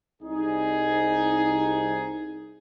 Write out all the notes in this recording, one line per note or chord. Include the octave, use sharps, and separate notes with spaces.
C2 D#4 G#4